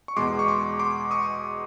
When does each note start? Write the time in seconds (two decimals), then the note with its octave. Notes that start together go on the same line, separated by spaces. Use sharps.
0.08 C#6
0.17 E2 B2 G#3 C6 D6
0.39 C#6
0.48 C6 D6
0.79 C6 D6
1.11 C#6 D#6